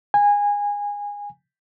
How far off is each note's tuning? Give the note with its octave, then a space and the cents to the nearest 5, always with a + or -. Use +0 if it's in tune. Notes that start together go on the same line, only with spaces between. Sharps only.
G#5 -20